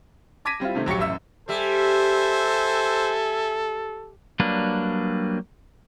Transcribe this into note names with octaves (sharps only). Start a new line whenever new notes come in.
A5 D6 G#6 A#6 B6 D#7
G3 C4 E4 F4
C3 D#3 A3 C4
A#1 F#3 G4 C#6 C#7
A1 F#2 E5 E6
G3 A4 C5 E5 G#5
F#3 G3 A#3 D4 B4